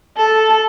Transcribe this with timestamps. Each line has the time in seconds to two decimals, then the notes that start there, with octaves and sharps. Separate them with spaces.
0.17 A4